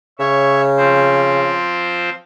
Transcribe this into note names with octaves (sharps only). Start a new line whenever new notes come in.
C#3 C#5 E5
F3 C4 C5